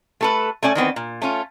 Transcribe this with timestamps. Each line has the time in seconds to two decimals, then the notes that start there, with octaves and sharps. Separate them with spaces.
0.21 A3 A4 B4
0.63 A3 C#4 D5 G#5
0.75 D#3 E3 B3 C4
0.96 A#2
1.22 A3 C#4 F4